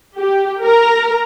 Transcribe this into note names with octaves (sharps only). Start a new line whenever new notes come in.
G4
A#4 A#5